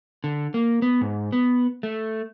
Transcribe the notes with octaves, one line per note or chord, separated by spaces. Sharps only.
D3
A#3
B3
G#2
B3
A3